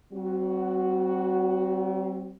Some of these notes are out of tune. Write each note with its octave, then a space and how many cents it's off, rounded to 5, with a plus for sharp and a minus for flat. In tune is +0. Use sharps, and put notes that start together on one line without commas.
G3 -45 C4 +0 F#4 +0